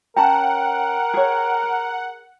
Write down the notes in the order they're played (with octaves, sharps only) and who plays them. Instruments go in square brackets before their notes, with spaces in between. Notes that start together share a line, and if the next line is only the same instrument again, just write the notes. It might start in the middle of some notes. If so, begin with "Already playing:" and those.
[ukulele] C#4 A5 A#5 [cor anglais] A#4 [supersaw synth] F#5 [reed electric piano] G5
[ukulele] G#4 C#5